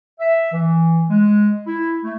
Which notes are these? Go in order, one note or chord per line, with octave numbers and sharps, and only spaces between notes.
E5
E3
G#3
E4
A3